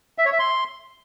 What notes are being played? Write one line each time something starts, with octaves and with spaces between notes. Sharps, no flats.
E5
C#5
E5
C6